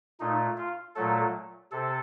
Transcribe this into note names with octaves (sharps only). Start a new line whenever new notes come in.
A#2 A3 D#4
F4
A#2 F#3 A3 A4
C3 A4